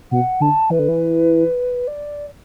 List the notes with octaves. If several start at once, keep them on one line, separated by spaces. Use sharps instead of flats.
B2 F#5
D3 A5
E3 B4
D3
E3
D5